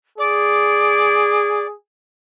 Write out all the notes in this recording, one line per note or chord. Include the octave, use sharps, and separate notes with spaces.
G#4 D5